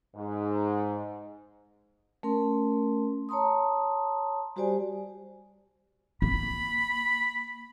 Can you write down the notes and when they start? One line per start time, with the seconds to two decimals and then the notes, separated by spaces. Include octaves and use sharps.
0.16 G#2
2.23 A3 C#4 A#4 C6
3.29 C#5 A5 A#5 C6 D#6
4.56 G3 F#4 G4 C5 D5 G#5
6.22 A#3 B5